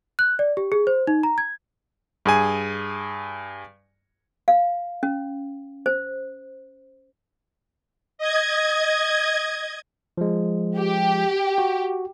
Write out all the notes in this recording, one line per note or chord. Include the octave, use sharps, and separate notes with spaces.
F#6
D5
G4
G#4
C5
D#4
A#5
G#6
G2 G#4 G#5
F5
C#4
C5
D#5 G#6
F3 G#3
G4
F#4